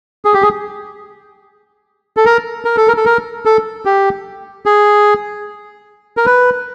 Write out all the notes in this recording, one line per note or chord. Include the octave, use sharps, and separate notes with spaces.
G#4
G4
G#4
A4
A#4
A#4
A4
A#4
A4
A#4
A4
G4
G#4
A#4
B4